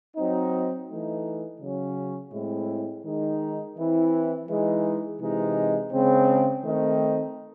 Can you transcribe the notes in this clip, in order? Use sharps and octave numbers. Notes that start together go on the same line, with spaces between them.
F#3 C4 D#4
E3 A3 D#4
C#3 F#3 C#4
A2 G#3 C4 E4
D#3 G#3 D#4
E3 C4 E4
E3 G#3 D#4
C3 E3 G#3 D#4
C#3 G#3 C4
D#3 A3 C4 D#4